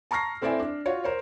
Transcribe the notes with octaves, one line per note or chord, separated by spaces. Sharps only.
A5 A#5 C#6 F6 A#6 C7
A3 C4 E4 D5 E5 G#5
D4
F4 F#4 C#5
A#4 C5 C#5